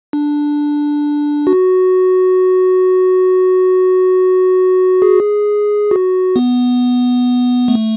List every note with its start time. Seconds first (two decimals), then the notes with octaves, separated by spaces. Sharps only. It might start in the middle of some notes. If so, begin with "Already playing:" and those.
0.13 D4
1.47 F#4
5.02 G#4
5.91 F#4
6.36 B3
7.68 A3